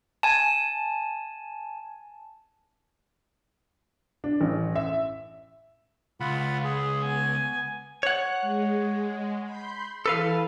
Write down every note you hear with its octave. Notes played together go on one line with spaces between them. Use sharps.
G#5 A5
D4
A1
E5
C#2 F4 F#5 B5
G#4
B3 G#5
C#5 F#5 F#6
G#3
B5 C6 G6
E3 A4 B4 F5 A5